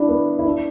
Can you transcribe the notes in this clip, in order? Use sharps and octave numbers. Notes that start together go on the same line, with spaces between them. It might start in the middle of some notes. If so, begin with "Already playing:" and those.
Already playing: D4 E4
B3
E4
D4